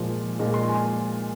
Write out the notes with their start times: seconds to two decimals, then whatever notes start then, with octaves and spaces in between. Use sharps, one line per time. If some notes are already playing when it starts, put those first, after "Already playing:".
Already playing: A#2 F3 G#3
0.39 A#2 F3 G#3
0.54 C6
0.69 G#5